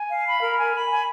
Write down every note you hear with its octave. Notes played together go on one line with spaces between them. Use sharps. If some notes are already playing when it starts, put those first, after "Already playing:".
Already playing: G#5
F5
B5
A#4
G#5
B5
G#5